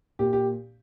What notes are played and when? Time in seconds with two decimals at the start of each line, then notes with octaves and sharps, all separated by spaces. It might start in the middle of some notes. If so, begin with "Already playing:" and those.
0.19 A#2 G4
0.33 G4